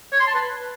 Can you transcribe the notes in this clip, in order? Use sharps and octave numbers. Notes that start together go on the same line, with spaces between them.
C#5
C6
A5
B4